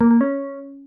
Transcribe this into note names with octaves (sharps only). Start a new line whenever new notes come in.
A#3
A#3
C#4